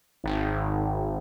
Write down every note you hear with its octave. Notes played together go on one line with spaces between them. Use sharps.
G#1